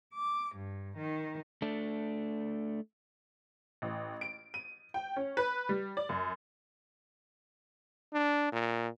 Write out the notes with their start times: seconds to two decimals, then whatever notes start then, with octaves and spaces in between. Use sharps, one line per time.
0.13 D6
0.55 G2
0.96 D#3
1.62 A3 D4
3.82 A1
4.21 D7
4.54 D#7
4.94 G5
5.16 C#4
5.37 B4
5.69 G3
5.97 D5
6.09 F#2
8.14 D4
8.52 A#2